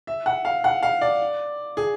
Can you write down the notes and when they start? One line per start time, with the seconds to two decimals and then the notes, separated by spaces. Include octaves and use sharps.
0.07 E5
0.26 F#5
0.45 F5
0.64 F#5
0.83 F5
1.01 D5
1.77 G#4